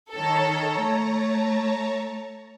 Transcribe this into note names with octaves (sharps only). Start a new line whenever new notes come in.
D#3 A4 C#5 A5 A#5
A3